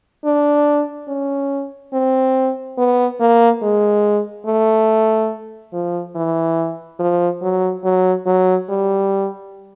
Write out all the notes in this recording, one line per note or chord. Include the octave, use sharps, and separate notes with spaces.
D4
C#4
C4
B3
A#3
G#3
A3
F3
E3
F3
F#3
F#3
F#3
G3